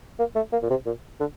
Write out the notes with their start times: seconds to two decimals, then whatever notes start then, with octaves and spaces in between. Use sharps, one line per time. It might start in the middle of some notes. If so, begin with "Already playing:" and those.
0.19 A#3
0.36 A3
0.52 A#3
0.63 A#2
0.70 C3
0.86 A#2
1.20 D3